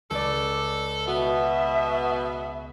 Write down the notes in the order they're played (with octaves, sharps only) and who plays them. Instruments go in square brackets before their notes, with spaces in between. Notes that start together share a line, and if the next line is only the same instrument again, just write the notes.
[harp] C#2 D5 [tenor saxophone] A4
[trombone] B2 [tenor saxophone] B3 [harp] F#4 [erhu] E5